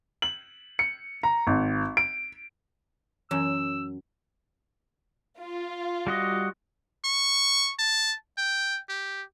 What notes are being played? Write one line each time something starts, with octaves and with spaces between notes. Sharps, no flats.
F#7
C#7
A#5
G#1
D7
F#2 E3 C#4 E6
F4
G3 F#4 D#5
C#6
A5
G5
G4